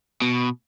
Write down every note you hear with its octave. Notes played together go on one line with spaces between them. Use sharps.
B2